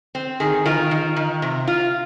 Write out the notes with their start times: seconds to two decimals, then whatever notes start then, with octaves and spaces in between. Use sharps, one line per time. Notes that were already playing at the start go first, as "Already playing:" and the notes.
0.15 C4
0.40 D#3 G#4
0.65 D#3 F4 A#4
0.91 D#3
1.16 D#3
1.42 C3
1.67 F4